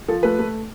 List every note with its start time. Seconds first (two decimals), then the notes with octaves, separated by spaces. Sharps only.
0.08 F3 A4
0.23 A3 B4
0.39 A3